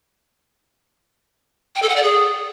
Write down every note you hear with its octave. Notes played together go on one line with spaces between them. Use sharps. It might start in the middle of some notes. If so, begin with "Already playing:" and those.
G5
A4
F#5
D5
G#4